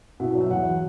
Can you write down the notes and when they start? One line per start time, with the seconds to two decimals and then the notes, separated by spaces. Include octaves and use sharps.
0.20 B2 E4
0.31 F#4
0.35 F#3
0.41 E5
0.51 E2 F#5